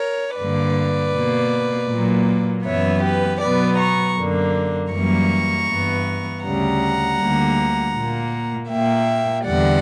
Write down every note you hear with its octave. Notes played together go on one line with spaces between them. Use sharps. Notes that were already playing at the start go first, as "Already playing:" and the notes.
Already playing: A#4 C#5
G2 D3 A#3 B4 D5
B2 A#3
A#2 F#3 A#3
F#2 E3 B3 C#5 E5
G4 B4
B2 F#3 B3 B4 D5
A#5 C#6
F#2 D3 A#3
F#2 E3 G3 A#3 A#5 C#6
G2 E3 B3
D2 C#3 G3 F#5 A#5
D2 D3 G3 A#3
A#2 A#3
A#2 A#3 E5 G5
E2 D3 G3 D5 F#5